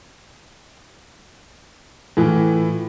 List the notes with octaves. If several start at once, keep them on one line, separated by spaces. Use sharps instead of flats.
A2 E3 F4